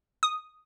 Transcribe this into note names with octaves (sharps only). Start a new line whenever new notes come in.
D#6